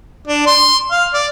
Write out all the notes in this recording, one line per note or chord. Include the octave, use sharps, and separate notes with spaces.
D4
C6
F5
D5